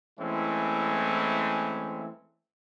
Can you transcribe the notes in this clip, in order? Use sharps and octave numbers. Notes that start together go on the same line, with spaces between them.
E3 G#3 A3 C4 C#4 E4